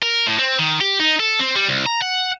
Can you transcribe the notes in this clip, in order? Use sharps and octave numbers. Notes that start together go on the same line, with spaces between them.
A#4
A2
C4
D#3
G4
D#4
A4
C4
G3
C2
A#5
F#5